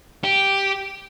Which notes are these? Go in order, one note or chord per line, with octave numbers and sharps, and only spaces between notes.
G4